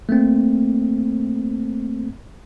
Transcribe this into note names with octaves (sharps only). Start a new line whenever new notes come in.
A3 A#3 C4